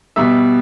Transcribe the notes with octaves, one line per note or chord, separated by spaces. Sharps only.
B2 G3 E5